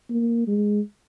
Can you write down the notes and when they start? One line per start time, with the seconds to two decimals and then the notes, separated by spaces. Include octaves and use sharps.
0.10 A#3
0.47 G#3